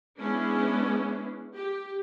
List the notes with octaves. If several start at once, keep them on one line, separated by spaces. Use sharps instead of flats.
G#3 B3 C#4 D4 E4
G4